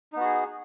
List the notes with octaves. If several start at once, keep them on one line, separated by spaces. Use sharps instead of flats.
B3 D#4 F#4 G#4